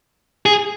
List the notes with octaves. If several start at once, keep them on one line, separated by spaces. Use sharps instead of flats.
G#4